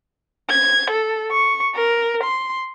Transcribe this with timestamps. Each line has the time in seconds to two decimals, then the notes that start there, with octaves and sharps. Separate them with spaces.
0.49 G#6
0.90 A4
1.32 C#6
1.75 A#4
2.24 C6